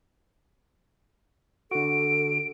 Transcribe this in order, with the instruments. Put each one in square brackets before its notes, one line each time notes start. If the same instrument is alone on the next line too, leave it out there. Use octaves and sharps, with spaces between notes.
[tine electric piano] D3 F#4 [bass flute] A4 [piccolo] D7